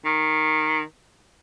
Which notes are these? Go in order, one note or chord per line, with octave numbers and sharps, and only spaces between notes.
D#3